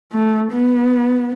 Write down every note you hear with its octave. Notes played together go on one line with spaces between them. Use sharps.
A3
B3